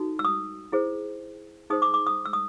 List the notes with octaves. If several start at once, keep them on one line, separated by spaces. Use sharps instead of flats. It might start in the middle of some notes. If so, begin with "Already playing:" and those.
Already playing: D#4 F#4 A4
E6
D#6
E4 G#4 C5
D#4 G#4 C5 D#6
D6
D6
D#6
E6
D#6